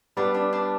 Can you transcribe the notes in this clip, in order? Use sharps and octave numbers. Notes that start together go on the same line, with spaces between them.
G3 B3 D4
D4
D4